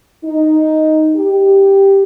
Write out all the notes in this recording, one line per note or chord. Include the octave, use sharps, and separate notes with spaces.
D#4
G4